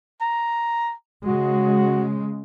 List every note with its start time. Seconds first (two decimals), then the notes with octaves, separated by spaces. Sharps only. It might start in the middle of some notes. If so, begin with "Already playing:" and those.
0.21 A#5
1.25 C#3 G#3 F#4